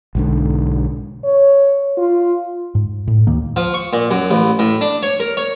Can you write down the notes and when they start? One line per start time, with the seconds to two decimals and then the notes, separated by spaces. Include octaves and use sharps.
0.15 B1 G#2 D3
1.24 C#5
1.98 F4
2.75 G#2
3.07 A2
3.27 D2 D#3 A#3
3.56 F3
3.74 C#6
3.93 A#2
4.11 F#2
4.31 A1
4.59 A2
4.81 D4
5.03 C#5
5.20 A#4
5.37 C#5